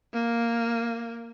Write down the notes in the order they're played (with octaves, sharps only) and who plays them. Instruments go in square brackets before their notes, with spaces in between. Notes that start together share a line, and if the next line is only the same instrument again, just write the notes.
[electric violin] A#3